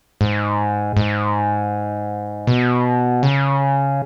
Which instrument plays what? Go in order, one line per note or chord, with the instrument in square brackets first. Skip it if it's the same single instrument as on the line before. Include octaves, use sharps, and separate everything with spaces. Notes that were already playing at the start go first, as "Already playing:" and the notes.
[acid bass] G#2
G#2
B2
C#3